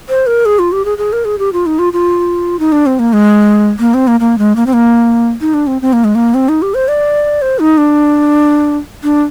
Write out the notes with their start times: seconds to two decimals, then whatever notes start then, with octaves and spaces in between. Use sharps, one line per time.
0.09 C5
0.27 A#4
0.46 G#4
0.59 F4
0.72 G4
0.85 G#4
0.98 G#4
1.13 A#4
1.25 G#4
1.39 G4
1.53 F4
1.66 D#4
1.79 F4
1.93 F4
2.59 D#4
2.72 D4
2.86 C4
2.99 A#3
3.13 G#3
3.80 A#3
3.94 C4
4.07 A#3
4.20 A#3
4.38 G#3
4.56 A#3
4.67 C4
4.73 A#3
5.41 D#4
5.54 D4
5.67 C4
5.82 C4
5.93 A#3
6.04 G#3
6.15 A#3
6.34 C4
6.49 D#4
6.62 G4
6.74 C5
6.88 D5
7.42 C5
7.59 D#4
7.78 D4
9.03 D4